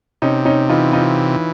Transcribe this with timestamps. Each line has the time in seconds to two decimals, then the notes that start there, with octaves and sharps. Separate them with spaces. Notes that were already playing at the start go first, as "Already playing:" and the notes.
0.22 C3 C#4 D#4
0.45 C#4 D#4
0.69 E3 D#4 F4
0.93 D#4 F4